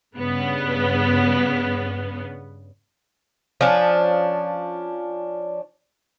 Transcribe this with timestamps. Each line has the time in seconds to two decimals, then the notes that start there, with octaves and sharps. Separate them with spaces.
0.16 G2 C#3 B3
3.61 F3 C#4 D4